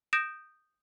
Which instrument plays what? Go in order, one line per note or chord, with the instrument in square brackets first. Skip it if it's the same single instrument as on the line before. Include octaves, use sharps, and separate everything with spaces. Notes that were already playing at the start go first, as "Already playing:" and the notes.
[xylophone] D#6 G6 A#6 D7 E7